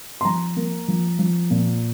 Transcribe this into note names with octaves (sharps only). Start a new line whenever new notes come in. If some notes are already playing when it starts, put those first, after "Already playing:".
C6
F3 A#5
A#3
F3
F3
A#2